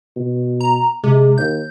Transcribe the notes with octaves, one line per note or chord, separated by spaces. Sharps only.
B2
A#5
C3 G#3
D#2 G6